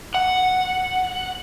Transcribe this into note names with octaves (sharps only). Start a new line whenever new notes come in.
F#5